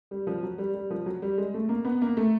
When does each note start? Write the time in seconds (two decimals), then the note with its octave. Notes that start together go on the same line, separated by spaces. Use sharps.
0.11 G3
0.27 F3
0.43 F#3
0.58 G3
0.74 G3
0.90 F3
1.06 F#3
1.22 G3
1.38 G#3
1.54 A3
1.69 A#3
1.85 B3
2.02 A#3
2.17 A3